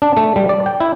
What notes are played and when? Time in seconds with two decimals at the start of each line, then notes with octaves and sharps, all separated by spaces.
0.02 D4
0.17 A3
0.36 G3
0.49 D5
0.66 G5
0.80 E4